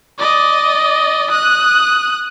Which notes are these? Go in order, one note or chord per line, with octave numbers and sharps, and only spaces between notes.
D5 D#5
D#6 F#6